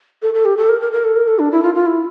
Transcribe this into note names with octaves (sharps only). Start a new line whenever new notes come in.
A4
A4
G4
A4
A#4
A#4
A#4
A4
A#4
A4
D4
E4
F4
F4
E4